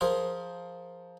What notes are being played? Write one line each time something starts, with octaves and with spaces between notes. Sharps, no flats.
F3 G#4 A#4 C5